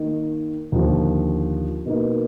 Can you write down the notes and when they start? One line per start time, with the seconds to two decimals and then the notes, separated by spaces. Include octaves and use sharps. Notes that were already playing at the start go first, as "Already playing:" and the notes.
Already playing: D#3 A#3 D#4
0.72 D#2 D3 F3
1.86 B2 A#3 D#4